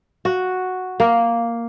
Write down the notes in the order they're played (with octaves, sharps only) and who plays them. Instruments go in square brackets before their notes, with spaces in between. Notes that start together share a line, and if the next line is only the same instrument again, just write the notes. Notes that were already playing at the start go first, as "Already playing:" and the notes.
[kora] F#4
A#3